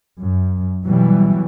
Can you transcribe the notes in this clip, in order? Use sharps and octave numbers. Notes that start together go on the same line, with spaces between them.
F#2
B2 E3 F#3 G3